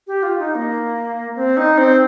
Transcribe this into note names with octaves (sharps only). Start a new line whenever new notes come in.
G4
F4
D#4
A#3
C4
D#4
C4